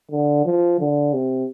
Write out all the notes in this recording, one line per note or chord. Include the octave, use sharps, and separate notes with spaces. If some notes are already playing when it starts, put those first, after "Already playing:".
D3
F3
D3
C3